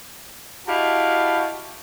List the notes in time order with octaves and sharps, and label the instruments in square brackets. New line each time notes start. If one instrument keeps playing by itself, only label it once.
[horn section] E4 F#4 G4 D#5 F5 A5